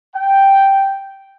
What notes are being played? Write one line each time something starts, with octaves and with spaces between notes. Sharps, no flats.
G5